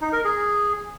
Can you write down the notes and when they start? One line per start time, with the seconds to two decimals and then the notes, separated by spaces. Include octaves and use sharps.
0.01 D#4
0.13 A#4
0.24 G#4